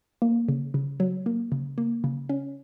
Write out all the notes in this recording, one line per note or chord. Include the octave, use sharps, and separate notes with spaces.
A#3
C#3
C#3
F#3
A#3
C#3
A#3
C#3
C#4